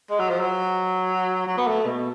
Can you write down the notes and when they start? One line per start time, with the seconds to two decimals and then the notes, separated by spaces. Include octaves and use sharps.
0.10 G#3
0.19 F#3
0.29 F3
0.40 F#3
1.47 F#3
1.57 B3
1.67 A3
1.86 B2